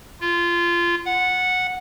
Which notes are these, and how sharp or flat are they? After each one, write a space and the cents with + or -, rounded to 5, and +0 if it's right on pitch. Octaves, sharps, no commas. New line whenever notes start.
F4 -20
F#5 -10